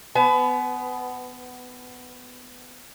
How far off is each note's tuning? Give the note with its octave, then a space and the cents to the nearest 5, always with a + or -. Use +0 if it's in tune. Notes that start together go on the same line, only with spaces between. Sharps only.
B3 +15 B4 +30 G#5 +45